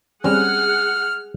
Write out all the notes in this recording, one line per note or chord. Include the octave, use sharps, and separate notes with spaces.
G3 G#3 C4 C#4 G#4 F#5 F6